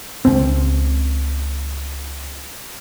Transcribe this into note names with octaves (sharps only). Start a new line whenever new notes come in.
C#2 C4